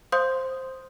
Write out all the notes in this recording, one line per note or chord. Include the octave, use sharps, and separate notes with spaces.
C5 F5 C6 D#6 G6